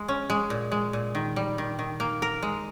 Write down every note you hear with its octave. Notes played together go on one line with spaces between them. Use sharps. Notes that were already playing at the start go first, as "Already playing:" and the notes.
Already playing: G#3
C#4
G#3
A#2
G#3
A#2
D#3
G3
D#3
D#3
A#3
A#4
G#3